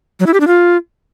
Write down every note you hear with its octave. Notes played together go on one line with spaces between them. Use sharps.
F#3
E4
G4
D4
F4